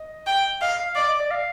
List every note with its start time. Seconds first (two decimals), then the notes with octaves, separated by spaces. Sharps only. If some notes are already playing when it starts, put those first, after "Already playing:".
Already playing: D#5
0.27 G5
0.61 D#5 F5
0.79 F5
0.96 D5 D#5
1.08 D#5
1.20 D5
1.31 F5